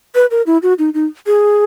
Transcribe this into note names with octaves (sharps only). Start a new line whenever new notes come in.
B4
A#4
E4
F#4
D#4
D#4
G#4